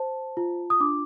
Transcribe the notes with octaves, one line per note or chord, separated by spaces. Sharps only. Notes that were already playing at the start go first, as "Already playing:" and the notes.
Already playing: C5 A5
F4
D#6
D4 D6